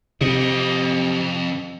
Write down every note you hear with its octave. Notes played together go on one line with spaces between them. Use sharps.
F2 C3 D#5